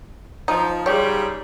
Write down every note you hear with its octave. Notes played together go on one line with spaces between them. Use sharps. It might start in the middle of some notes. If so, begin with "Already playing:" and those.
F3 D#4
G#2 C#3 G3 G4 C#5